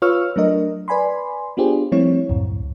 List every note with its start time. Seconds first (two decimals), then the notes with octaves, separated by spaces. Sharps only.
0.02 F4 B4 C#5 C#6 E6 F6
0.36 F#3 A3 D4 A#4 D#5
0.88 B4 D5 G#5 B5 C6
1.57 B3 D4 F4 G4 G#4 C5
1.92 F3 G3 A3 C4 E4 C#5
2.29 C#2 F#2 A2